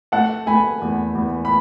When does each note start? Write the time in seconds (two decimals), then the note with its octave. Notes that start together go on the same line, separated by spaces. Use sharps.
0.12 A3 F#5 A5
0.47 A3 G#5 B5
0.82 E2
1.15 E2
1.45 B5